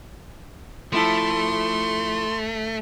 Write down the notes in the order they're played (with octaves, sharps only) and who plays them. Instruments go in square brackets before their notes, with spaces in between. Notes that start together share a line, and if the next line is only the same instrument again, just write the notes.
[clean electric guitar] F3 E4 A4 [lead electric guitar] A3 [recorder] C6